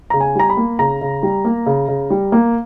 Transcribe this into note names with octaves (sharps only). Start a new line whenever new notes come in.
C#3 A#5
G#5
G3 A#5
B5
A#3
C#3 A#5
C#3
G3
A#3
C#3
C#3
G3
A#3